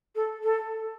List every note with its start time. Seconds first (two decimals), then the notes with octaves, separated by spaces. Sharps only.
0.15 A4
0.43 A4